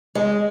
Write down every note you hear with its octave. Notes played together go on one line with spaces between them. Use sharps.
G#3